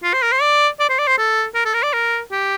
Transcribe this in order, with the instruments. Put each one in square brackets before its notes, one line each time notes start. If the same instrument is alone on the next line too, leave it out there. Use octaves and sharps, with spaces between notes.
[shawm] F4
C5
A#4
C5
D5
D5
C5
D5
C5
A4
A#4
A4
A#4
D5
A#4
G4